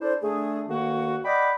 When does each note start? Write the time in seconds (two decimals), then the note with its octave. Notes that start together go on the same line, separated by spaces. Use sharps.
0.01 D4 E4 A4 C5
0.22 D3 A3 D4 G#4
0.69 D2 D#3 A#3 F#4
1.25 D5 D#5 F#5 G5 B5 D6